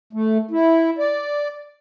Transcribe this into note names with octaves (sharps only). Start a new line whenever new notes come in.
A3
E4
D5